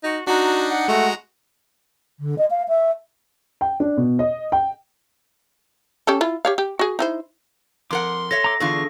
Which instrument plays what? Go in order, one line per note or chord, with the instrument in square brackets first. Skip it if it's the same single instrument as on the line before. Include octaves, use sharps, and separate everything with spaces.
[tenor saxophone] D#4 [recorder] F#4
[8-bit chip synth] D4 D#4 [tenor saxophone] F#4 [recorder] A#5
[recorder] F#5
[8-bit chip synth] G#3 F#4 A#5 [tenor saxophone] A3
[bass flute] D3
D#5
F5
E5
[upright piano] G5
D4
B2
D#5
G5
[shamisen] C#4 G4 A4
E4 F4
G4 C#5 F5
G4
F#4 G#4
D#4 E4 C5
[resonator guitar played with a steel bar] F2 A#4 F#5 [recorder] C6 [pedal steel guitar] D6
[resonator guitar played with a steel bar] A4 C#5 E5 [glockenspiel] A#6
[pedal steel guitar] A#5 D6
[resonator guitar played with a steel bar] E2 D3 F4 [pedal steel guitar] D4 G#4 A4 [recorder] C#6